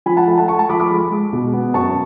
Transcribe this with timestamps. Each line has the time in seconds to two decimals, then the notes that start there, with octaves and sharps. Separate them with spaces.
0.06 F3 G#5 B5
0.17 F#5 A5
0.27 A3
0.38 F#5 A5
0.48 A3 A5 C#6
0.59 A5 C#6
0.69 F3 B5 D6
0.80 B5 D6
0.90 G#3
1.12 G#3
1.33 B2
1.53 B3
1.74 F#2 A5 C#6